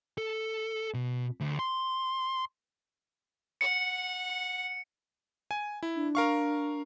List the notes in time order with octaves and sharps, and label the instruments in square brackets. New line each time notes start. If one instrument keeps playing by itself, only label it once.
[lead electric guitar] A4
B2
D2
C6
[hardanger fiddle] F#5 [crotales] C#7
[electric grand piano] G#5
E4
[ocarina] D4
[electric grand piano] A#4 F5 C#6